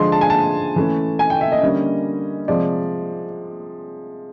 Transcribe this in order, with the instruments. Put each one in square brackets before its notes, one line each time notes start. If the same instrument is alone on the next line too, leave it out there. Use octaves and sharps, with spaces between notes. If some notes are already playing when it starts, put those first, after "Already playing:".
Already playing: [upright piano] D3 F3 G#3 C6
A5
G#5
A5
E3 A3 C#4
G#5
G5
E5
D#5
D3 G3 A#3 C#4
C3 F3 G#3 D5